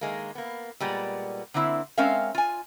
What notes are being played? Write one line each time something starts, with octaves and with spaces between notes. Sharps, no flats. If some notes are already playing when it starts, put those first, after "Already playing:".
D#3 G#3 A#3
A#3 B3
A#2 G3 G#3 B3
D3 A#3 C4 E4
G#3 C4 C#4 A#4 E5 F5
F4 G#5